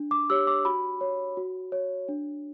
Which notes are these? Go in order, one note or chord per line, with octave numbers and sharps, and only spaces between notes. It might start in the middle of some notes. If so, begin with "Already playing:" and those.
Already playing: D4
D6
G4 C#5 E6
D6
F#4 B5
C#5
F#4
C#5
D4